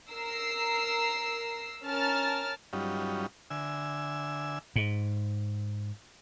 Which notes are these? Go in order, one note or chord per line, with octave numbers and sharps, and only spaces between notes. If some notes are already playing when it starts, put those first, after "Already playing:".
A#4 A#5 E6 C7
C#4 A#4 A5 F6 A6
G2 F#3 G3 C#4 D#4 F4
D3 E5 G#5 E6
G#2